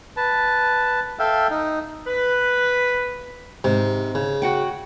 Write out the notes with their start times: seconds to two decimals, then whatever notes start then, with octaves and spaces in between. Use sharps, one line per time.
0.17 B4 A5
1.19 A4 E5 F5 G5
1.50 D#4
2.07 B4
3.64 G#2 C3
4.15 C#3
4.42 F#4 F#5 G5